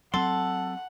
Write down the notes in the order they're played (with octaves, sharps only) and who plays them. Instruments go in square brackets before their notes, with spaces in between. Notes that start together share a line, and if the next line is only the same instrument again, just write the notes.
[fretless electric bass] F#3 C4 [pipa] A4 [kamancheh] F#5 [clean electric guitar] C6